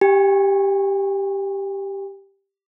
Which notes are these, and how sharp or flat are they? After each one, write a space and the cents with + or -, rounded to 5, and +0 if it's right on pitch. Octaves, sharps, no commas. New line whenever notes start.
G4 +0 G#5 -45